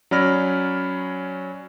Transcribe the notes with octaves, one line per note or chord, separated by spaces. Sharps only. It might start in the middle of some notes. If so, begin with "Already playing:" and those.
F#3 C#4 D5 B5 F6 A#6